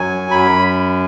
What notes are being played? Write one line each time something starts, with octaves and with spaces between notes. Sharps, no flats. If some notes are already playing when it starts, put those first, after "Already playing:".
Already playing: F#2 F#3 G#5
F#2 B5